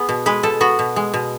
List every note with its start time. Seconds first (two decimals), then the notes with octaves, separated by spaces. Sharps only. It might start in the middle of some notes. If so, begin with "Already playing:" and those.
Already playing: B3 G#4
0.09 B2
0.26 G#3 B4
0.43 B2 A4
0.61 B3 F#4
0.79 B2
0.96 G#3
1.14 B2